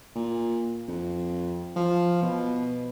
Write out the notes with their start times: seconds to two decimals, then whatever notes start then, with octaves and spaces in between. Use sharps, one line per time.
0.15 A#2
0.88 F2
1.76 F3
2.23 B2